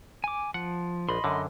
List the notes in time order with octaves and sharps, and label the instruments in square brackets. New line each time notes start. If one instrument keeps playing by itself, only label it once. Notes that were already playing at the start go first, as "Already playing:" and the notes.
[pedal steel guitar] G#5 D6
[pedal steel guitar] F3 [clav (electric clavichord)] F#5
[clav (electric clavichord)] A#1 [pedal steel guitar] D#5 B5 C6
[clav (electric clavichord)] F#2 D3